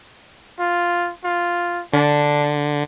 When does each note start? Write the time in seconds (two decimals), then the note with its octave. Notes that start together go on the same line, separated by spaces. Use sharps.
0.59 F4
1.24 F4
1.93 D3 D4